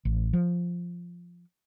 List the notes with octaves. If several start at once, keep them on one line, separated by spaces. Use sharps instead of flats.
A1
F3